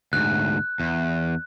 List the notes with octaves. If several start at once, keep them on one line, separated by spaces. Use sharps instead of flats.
D2 G#2 F#6
E2